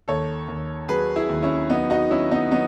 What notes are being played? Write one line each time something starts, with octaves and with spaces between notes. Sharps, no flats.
D#2 A4 C#5
D#2
F#3 G#4 B4
E4 G#4
D#2
C#4 E4
F#3 B3 D#4
D#4 F#4
F#3 C#4 E4
B3 D#4
F#3 B3 D#4